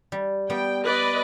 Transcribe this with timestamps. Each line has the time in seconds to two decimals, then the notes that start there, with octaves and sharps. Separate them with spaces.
0.12 G3
0.50 G3 B3 G5
0.85 B4 D5 D#5